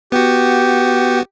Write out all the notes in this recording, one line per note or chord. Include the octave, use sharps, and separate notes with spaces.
B3 F#4 G4